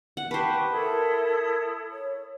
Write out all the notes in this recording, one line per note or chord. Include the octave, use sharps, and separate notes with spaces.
F#5
G4 B4 C5 A5 C#6
E4 A4 A#4 D#6
C#5